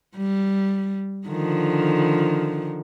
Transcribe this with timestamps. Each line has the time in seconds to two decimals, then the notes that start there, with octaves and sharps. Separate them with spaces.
0.17 G3
1.28 D3 D#3 F3